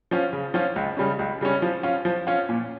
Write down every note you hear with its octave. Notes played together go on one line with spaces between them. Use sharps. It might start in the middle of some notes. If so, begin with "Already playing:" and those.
F3 C#4 F4
C#3
F3 C#4 F4
C#2
C#3 G3 C#4
C#2
C#3 G3 C#4
F3
C#4 F4
F3
C#4 F4
A#2